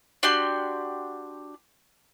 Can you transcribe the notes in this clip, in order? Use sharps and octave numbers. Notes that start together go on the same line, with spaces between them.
D4 F#4 G4 C6